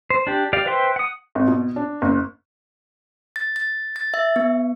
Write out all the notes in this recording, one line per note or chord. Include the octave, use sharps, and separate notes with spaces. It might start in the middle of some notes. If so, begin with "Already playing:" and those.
C5
D4 G4
G4 D5 F5
B4 C5 E5 G5 C6
F#5 D#6
G#1
B2
D4
F#1
A6
A6
A6
E5
B3